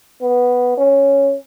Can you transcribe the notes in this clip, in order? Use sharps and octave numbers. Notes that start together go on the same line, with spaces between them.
B3
C#4